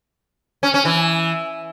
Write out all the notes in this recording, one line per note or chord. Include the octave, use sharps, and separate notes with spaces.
C#4
C#4
E3